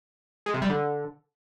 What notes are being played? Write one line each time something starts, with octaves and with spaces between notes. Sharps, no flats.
G#3
C3
G3
D3